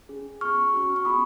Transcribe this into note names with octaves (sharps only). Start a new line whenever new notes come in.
C#4 G#4
B3 F4 G#4 C#6 F6
C#4 F#4
C#6
B3 F4 G#4 B5 D#6